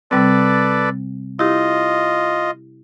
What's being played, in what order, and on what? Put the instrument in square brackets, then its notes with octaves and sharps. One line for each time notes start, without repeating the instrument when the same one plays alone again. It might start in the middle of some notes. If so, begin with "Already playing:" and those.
[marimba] C3 G3 C4 [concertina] A4 B4 D5
[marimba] E4 G4 [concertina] F4 D#5